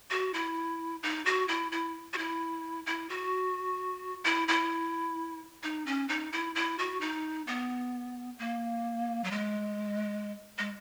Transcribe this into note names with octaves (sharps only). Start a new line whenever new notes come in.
F#4
E4
D#4
F#4
E4
E4
F#4
E4
E4
F#4
E4
E4
D#4
C#4
D#4
E4
E4
F#4
D#4
B3
A#3
F#3
G#3
G#3